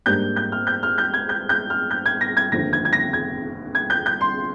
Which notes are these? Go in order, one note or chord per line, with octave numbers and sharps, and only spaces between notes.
G#2 G3 A#3 D4 G6
G6
F6
G6
F6
G6
G#6
G6
G6
F6
G6
G#6
A#6
G#6
F1 D#2 D3 F3 A#6
G#6
G#6
A#6
G#6
G#6
G6
G6
C6